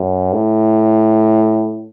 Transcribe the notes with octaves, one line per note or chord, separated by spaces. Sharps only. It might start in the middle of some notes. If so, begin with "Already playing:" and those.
Already playing: F#2
A2